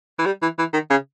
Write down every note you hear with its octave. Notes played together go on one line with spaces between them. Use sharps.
E3
G3
E3
E3
D#3
C#3